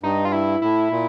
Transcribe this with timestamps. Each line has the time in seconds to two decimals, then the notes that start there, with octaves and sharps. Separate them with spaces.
0.03 G2 D#4
0.25 F4
0.32 E4
0.62 A2 E4
0.91 A#2